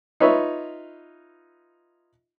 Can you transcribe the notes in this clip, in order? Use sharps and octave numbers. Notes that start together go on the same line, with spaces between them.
D#4 F4 B4 C#5 E5